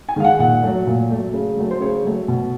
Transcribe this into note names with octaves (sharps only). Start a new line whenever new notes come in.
G#5
D#3 G#3 F5
F#5
A#2 F#5
F#3 A3
A#2
F#3 A3
C#3
F#3 A3
C5
C#3 C#5
F#3 A3
B2